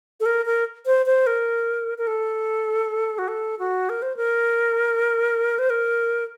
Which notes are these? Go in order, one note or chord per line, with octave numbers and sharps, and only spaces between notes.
A4
A#4
A#4
C5
C5
A#4
A#4
A4
F#4
A4
F#4
A#4
C5
A#4
C5
A#4